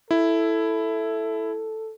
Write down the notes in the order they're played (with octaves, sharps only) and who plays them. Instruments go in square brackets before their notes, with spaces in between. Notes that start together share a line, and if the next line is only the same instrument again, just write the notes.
[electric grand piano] E4 [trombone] A4